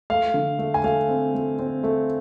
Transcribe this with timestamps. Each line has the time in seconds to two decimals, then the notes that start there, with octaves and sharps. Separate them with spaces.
0.10 A3 F5
0.34 D3
0.59 A3
0.74 G#5
0.84 A3 F5
1.09 C4
1.34 A3
1.59 C4
1.84 A3